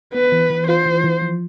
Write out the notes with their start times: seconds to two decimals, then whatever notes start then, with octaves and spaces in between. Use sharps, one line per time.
0.14 B3 B4
0.32 E3
0.50 E3
0.68 F4 C5
0.86 E3
1.04 E3
1.22 F3